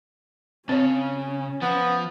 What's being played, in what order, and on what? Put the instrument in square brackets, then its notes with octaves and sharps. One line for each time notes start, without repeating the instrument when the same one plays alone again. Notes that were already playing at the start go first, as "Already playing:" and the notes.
[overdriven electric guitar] C#3 [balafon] C4 C#5 [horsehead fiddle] C#4
[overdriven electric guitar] F3 [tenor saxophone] B3